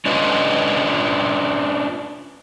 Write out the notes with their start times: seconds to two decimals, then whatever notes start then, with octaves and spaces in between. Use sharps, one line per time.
0.06 C#4 D4 F4 B4 D#5